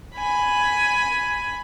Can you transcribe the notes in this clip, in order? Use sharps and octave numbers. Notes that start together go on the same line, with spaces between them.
G#5 B5